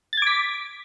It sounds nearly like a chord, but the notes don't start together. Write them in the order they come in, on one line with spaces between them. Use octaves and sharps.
A6 G#6 D6 B6